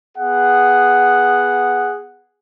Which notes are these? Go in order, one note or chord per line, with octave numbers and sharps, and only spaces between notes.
B3 G#4 F#5